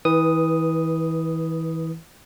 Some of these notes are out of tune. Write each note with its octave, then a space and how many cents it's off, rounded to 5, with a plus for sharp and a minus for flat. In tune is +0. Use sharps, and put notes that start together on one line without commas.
E3 -30 B4 +0 D#6 +0